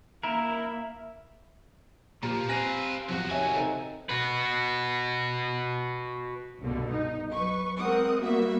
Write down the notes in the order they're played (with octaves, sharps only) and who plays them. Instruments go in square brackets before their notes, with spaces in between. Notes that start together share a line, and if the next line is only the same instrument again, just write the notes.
[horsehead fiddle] A#3 E5 [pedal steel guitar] E4 A#4
[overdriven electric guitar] A#2 [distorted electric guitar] F3 [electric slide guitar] G4 A#5
[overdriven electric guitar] C4 [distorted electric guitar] B4 F5 [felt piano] G#5 A#6 D#7
[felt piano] E2 F3 [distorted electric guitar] C3 F#4
[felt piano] D#3 C#5 E5 [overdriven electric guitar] G#5
[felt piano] C4 D#4 A4
[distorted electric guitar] F#4 B4
[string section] C2 G2 B2 D3
D#4
F#3 B4 C#6
G#3 C4 A#4 F#5 D#6
G3 A#3 B3 F#4 E5